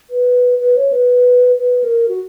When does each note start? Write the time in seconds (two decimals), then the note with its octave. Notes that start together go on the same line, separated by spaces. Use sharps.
0.10 B4
0.60 B4
0.77 C#5
0.92 B4
1.59 B4
1.84 A#4
2.08 F#4